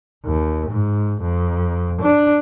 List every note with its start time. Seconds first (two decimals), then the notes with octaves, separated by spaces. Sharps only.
0.25 D#2
0.69 G#2
1.21 F2
2.01 D4